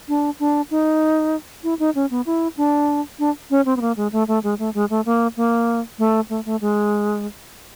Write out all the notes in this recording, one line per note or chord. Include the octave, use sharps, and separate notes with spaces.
D4
D4
D#4
E4
D#4
C#4
B3
E4
D4
D4
C#4
C4
B3
A#3
G#3
A3
A3
G#3
A3
G#3
A3
A#3
A#3
A3
A3
A3
G#3